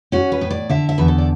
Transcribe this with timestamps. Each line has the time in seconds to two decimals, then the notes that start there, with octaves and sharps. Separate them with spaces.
0.12 C#4 F#4
0.32 B4
0.41 A2
0.50 D5
0.70 D3 E5
0.89 E5
0.98 E2 B4
1.08 A4
1.18 D5